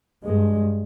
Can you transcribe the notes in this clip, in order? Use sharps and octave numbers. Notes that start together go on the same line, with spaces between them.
G2 G#3